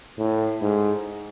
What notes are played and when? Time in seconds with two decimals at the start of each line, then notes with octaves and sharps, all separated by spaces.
0.18 A2
0.62 G#2